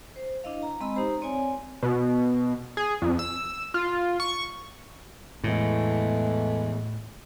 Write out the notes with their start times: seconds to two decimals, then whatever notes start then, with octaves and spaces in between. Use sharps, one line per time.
0.16 C5
0.44 D4 E4 D#5 F5
0.63 A#5
0.80 G#3 C4 D#5 B5 E6
0.95 D#4 G4 C5 A#5
1.22 C4 C#5 D5 G#5
1.83 B2
2.77 G#4
3.02 F2
3.19 E6
3.74 F4
4.20 C#6
5.44 E2 A2 E3 G#3 A3